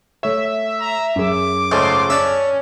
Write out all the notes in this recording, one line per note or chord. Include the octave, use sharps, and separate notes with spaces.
A3 C#5 E5
A#5
F#2 G#4 D6
C#2 G#2 A3 C6
C#4 D4 E5